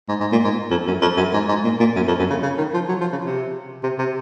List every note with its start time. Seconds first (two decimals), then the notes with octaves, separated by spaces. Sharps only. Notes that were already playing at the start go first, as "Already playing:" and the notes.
0.08 G#2
0.20 G#2
0.32 A#2
0.44 G#2
0.71 F2
0.87 F#2
1.02 F2
1.17 F#2
1.34 G#2
1.49 G#2
1.64 A#2
1.80 A#2
1.96 F#2
2.08 F2
2.19 F#2
2.30 C#3
2.43 C#3
2.58 D#3
2.74 F3
2.89 F#3
3.01 F3
3.12 C#3
3.25 C3
3.83 C3
3.99 C3